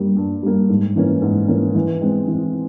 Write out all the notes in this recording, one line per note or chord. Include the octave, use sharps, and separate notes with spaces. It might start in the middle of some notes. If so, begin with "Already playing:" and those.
Already playing: G2 G3 A#3
G2
G3 A#3
G#2
E3 A#3 C#4
G#2
E3 A#3 C#4
E3
G#3 C4
E3